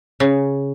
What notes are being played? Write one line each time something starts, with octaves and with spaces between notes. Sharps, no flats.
C#3